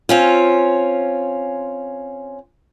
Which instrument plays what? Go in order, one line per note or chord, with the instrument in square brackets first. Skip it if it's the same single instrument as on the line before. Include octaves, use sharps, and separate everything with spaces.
[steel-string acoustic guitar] C4 C#4 F4